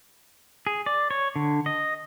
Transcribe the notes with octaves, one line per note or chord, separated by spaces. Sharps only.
G#4
D5
C#5
D3
D#5